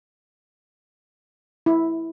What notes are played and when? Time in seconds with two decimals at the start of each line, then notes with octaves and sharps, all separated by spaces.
1.66 E4